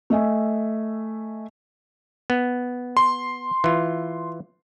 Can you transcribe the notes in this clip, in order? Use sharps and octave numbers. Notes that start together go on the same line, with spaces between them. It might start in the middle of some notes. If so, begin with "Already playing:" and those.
A3 D#5 E5 G#5
B3
C6
E3 F4